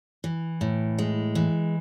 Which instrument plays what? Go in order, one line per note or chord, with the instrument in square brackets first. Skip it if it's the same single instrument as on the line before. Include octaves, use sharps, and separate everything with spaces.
[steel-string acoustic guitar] E3
A2
G#3
E3